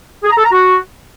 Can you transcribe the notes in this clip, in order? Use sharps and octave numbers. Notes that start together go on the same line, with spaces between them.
G#4
A#5
A4
A#5
F#4